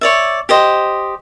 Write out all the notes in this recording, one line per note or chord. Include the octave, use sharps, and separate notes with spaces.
C#5 D5 E5
G4 C5 D#5